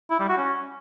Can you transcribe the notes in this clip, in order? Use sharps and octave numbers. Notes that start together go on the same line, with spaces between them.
E4
G3
F#4
C#4